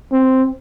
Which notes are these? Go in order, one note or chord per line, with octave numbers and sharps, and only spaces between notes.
C4